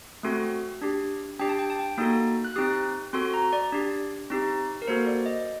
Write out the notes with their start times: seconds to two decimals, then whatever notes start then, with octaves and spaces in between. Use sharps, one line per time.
0.23 A3 C4 F#4 A4 C6
0.82 D4 G4
1.39 D4 G4 G5
1.49 A5
1.59 G5
1.70 A5
1.79 G5
1.98 A#3 D#4 F#4 A4 D#6
2.44 F#6
2.56 C4 D#4 G4 D#6
3.13 C4 F#4 A4 C6
3.34 A#5
3.53 D5
3.72 D4 G4
4.30 C4 D#4 G4
4.82 A#4
4.88 A#3 F#4 A4 C5
5.07 D5
5.26 D#5